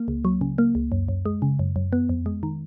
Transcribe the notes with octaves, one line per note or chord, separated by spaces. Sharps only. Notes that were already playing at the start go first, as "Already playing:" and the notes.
Already playing: A#3
C#2
F#3
C#3
A#3
C#2
F#2
F#2
G#3
C#3
F#2
F#2
B3
F2
G#3
D#3